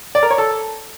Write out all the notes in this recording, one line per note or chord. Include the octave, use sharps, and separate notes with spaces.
D5
A#4
C#5
A4